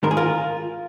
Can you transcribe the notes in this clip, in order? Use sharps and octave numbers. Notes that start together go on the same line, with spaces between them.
G#2 D#3 G#3 A#4
G#4
F4 A#4